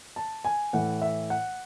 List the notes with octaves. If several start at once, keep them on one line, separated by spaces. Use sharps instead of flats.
A5
G#5
A2 E3 A3 F#5
E5
F#5